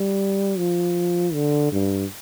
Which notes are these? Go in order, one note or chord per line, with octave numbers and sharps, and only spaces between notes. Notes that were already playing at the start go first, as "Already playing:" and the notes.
Already playing: G3
F3
D3
G2